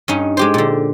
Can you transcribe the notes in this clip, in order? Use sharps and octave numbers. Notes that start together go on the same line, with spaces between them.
G2 C#4 D#4
G#3 G4 C5
A#2 D3